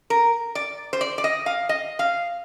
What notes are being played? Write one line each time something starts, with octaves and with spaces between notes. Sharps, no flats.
A#4
D5
C5
D5
D5
D#5
F5
D#5
F5